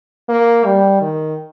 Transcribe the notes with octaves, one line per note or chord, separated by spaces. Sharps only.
A#3
G3
D#3